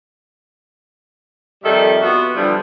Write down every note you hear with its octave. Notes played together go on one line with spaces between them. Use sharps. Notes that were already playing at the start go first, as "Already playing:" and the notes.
F2 D#3 G3 A4 E5
B3 F4 F#4
D3 E3 F3 G3 F4